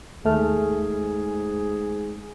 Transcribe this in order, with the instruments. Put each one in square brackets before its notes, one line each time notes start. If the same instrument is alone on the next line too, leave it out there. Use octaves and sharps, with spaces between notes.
[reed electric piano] D#2 A3 F6 [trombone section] G#2 G#4